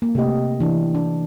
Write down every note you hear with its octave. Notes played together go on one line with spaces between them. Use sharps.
A#3
C3 A3 A#3 G4 D#5
E3 D4
D4